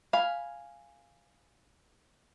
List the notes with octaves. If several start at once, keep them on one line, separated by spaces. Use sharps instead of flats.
F5 G#5 B5